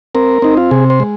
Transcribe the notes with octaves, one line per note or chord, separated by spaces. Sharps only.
C4 A#4
C4 D#4
F4
C3 G#4
C5
G#3